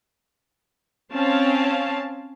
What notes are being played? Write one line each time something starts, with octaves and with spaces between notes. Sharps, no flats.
C4 C#4 F5 A5